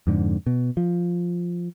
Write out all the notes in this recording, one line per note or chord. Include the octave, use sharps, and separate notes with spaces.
F2 G#2 D3
B2
F3